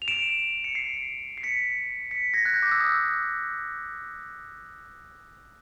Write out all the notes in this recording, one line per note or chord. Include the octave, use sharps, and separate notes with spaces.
F7
D7 E7
C#7
C7 D7
C7
B6 C#7
B6 C#7
G#6 A#6
F#6 G#6
G6
D6
E6
D#6